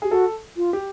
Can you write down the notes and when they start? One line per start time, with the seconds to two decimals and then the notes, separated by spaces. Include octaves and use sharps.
0.02 G4 G#4
0.11 F#4 A4
0.57 F4
0.73 G4